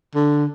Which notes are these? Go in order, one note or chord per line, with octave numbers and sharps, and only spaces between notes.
D3